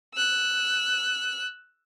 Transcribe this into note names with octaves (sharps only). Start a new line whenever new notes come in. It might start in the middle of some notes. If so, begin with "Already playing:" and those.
E6 F#6